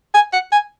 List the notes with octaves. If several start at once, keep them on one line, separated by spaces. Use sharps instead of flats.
G#5
F#5
G#5